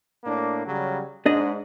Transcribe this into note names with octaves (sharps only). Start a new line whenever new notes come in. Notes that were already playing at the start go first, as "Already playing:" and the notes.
A2 A#3 D4
C#3 F#3 G3
G#2 D4 D#5